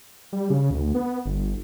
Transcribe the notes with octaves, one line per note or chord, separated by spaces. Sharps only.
G3
C#3
D2
B3
G1